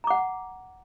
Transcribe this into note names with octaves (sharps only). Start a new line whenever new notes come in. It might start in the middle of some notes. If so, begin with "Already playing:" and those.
F#5 A#5 D6